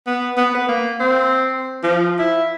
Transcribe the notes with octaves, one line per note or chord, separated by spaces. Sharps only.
B3
B3
B4
A#3
C4
F3
E4